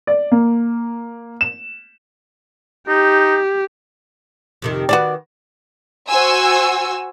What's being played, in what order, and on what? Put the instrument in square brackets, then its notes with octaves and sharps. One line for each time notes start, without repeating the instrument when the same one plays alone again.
[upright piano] D5
A#3
E7
[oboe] D#4 [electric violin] G4
[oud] F2 C3 D#3
[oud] D#3 G#4 B4 [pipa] F#4 D5
[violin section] F#4 C5 G#5 E6